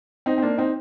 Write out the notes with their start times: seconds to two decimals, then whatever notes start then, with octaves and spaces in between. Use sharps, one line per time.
0.26 C4 D#4
0.38 C4
0.42 A#3 D4
0.58 C4 D#4